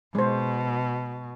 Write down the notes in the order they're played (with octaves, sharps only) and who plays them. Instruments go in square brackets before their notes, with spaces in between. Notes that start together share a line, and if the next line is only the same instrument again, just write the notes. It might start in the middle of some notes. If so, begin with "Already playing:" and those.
[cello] B2 [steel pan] G#3 C5